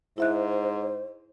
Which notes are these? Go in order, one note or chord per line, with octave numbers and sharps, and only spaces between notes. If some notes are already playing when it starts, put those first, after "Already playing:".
G#2 E4 C5 E5 F#6